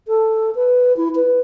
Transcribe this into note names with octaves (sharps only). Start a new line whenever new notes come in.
A4
B4
E4
B4